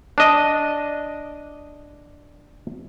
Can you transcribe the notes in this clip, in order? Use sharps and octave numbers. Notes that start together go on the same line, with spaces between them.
D4 D#5